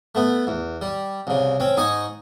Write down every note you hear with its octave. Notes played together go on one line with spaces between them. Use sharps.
A3 B3
E2
G3
C2 C#3
C4 C#4
G#2 D#4 D#5 G#5 C#6